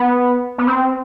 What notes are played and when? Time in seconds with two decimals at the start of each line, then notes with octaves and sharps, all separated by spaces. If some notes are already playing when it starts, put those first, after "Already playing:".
Already playing: B3
0.58 B3
0.67 C4